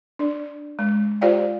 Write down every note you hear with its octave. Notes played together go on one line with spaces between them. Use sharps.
D4 D5
G#3
F4 G4 C5 D5 F5 G5